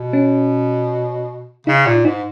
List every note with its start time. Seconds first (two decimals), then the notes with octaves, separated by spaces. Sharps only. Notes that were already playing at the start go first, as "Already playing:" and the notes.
Already playing: B2
0.13 C#4
1.67 C#3 D#4
1.86 A#2
2.05 G#2 D#4